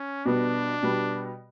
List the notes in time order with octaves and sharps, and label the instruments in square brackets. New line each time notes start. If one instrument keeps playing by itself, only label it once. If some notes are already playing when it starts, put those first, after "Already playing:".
Already playing: [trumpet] C#4
[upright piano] B2 G3 B3 [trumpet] D4
[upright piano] B2 G3 B3